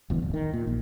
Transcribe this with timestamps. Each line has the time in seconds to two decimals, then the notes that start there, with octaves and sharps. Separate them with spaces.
0.10 F#1 E2
0.22 D1
0.34 D#3
0.54 A#2
0.67 A#1